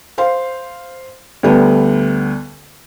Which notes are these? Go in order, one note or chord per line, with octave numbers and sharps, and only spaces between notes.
C5 F5 C6
D2 D3 G3 B3